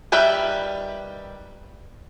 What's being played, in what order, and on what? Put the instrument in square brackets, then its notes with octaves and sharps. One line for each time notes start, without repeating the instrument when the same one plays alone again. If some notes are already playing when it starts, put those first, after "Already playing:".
[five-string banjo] D#3 G3 G4 B4 E5